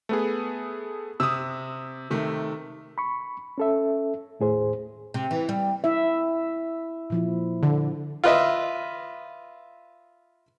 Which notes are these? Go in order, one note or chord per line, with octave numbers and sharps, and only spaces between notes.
A3 B3 G#4
C3 D#6 E6
C3 D#3 A3
B5 C#6
C#4 A4 E5
D#2 A2 G#4 C5
C3
E3
G3
E4 E5
A#2 F3 E4
D3
F4 B4 D#5 E5